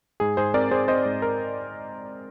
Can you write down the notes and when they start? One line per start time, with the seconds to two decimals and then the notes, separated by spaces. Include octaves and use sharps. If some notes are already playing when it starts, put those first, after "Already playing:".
0.20 G#2 G#4
0.37 G#2 G#4 C5
0.54 C4 A#4 D5
0.71 C4 G#4 C5
0.88 C4 C5 D#5
1.05 G#2
1.22 A#4